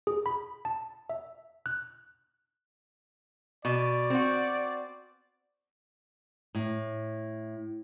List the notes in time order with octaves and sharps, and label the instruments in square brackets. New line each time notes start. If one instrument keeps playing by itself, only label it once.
[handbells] G#4
B5
A5
E5
F#6
[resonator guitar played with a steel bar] B2 [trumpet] D5
[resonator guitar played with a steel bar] C4 F#4
[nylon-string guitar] A2